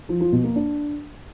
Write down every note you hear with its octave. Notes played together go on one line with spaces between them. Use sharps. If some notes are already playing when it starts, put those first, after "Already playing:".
F3
F3
B2
A#3
D4